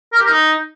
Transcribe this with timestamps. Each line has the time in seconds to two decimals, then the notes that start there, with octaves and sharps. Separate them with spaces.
0.12 A#4
0.18 G4
0.24 A#4
0.30 D#4